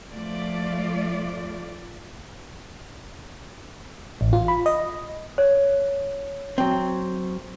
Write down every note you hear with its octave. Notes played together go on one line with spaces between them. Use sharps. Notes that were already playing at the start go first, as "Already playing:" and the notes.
F3 A3 F4 D5
A1
F4
B5
D#5
C#5
F#3 C4